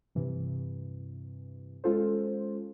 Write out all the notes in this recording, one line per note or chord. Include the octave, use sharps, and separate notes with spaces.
G2 C3 E3
G#3 C#4 F4 A4 C5